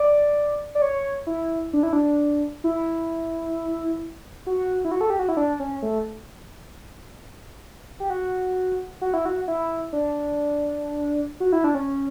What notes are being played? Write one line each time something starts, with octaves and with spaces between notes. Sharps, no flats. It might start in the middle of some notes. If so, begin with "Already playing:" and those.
Already playing: D5
D5
C#5
E4
D4
E4
D4
E4
F#4
E4
F#4
A4
G4
F#4
E4
D4
C#4
A3
G4
F#4
F#4
E4
F#4
E4
D4
F#4
E4
D4
C#4